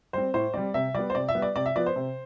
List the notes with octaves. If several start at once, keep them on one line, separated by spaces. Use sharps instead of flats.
G3 C4 C5
A2 C5
G3 C4 D5
C3 E5
G3 B3 D5
C5
C3 D5
E5
G3 B3
D5
C3 D5
E5
F3 B3 D5
C5
C3